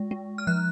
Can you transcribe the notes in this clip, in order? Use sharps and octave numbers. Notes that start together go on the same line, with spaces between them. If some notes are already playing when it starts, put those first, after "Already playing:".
Already playing: G#3
G#3
F6
F3 F#6